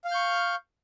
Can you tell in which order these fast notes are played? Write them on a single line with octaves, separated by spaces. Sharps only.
F5 F6 G6 C#6